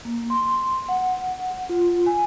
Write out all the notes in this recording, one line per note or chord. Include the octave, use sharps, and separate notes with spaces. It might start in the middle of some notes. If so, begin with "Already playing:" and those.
A#3
C6
F#5
F4
G#5